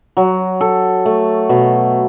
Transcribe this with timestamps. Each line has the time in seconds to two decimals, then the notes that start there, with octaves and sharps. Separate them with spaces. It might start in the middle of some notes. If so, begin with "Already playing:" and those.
0.17 F#3
0.61 A4
1.05 A3
1.49 B2